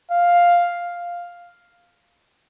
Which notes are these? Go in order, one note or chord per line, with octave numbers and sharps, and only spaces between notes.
F5